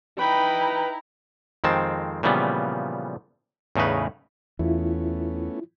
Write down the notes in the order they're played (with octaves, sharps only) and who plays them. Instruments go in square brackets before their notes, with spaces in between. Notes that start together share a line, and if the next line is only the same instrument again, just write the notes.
[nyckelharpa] D#4 B5 [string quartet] E4 A#5 [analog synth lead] B4 [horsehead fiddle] G5
[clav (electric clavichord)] F2 D#3 G#3 C4 A5
A#2 C#3 E3 F3 G3 B3
E2 A2 C#3 D#4 B4
[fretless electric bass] E2 [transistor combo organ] A3 B3 C#4 [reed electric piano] E4 F4